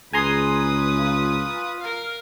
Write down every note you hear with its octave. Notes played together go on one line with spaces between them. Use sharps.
C#2 G#4 B4 G#5 A#5 C6 D#6
F4
A#4 F5